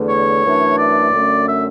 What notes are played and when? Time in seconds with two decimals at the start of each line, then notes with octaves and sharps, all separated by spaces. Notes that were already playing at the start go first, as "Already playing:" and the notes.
Already playing: E2 D3 A3
0.09 C#5
0.43 F#2 E3 A3 D4
0.77 D5
1.12 F#2 D3 A3 C#4
1.47 E5